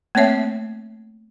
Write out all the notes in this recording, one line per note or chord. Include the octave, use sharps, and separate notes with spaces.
A3 A#3 C4 C#5 E5